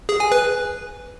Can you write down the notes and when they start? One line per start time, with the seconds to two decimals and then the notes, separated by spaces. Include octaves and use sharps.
0.09 G#4
0.20 G#5
0.32 B4